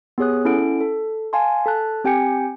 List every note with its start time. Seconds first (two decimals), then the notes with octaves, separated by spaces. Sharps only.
0.18 B3 G4 G#4 C#5 D#6 F#6
0.45 C#4 E4 A4 F#5 D7
0.81 A4
1.33 F5 G#5 A5 C6
1.66 A4 A5 F#6
2.04 C4 G4 G5 G#5 G6 C#7